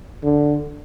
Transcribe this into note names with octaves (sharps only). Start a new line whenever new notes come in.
D3